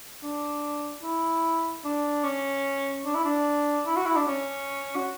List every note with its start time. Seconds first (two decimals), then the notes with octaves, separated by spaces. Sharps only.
0.23 D4
1.03 E4
1.85 D4
2.24 C#4
3.05 D4
3.15 E4
3.25 D4
3.86 E4
3.96 F#4
4.06 E4
4.16 D4
4.27 C#4
4.96 F#4